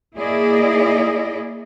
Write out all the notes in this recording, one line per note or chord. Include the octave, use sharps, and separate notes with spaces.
A#3 E4 G#4 D5 D#5